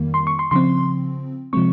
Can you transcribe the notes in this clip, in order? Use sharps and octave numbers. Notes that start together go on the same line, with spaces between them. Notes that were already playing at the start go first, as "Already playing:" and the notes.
Already playing: F2 D#3 G3 A#3
C6
C#6
C6
C#3 F3 C4 C6
C3 F3 G#3 C4 C#6